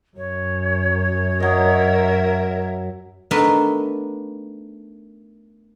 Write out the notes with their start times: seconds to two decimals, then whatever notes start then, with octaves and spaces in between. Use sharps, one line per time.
0.17 F#2 C#5
1.40 F#3 A#4 D#5 E5
3.31 A3 B3 D4 D#4 A4 A#4